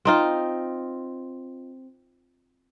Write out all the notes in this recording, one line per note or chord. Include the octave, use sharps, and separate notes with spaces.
C4 D#4 F4